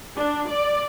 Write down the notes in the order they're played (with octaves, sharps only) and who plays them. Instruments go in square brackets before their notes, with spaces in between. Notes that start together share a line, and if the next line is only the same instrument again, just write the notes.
[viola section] D4
D5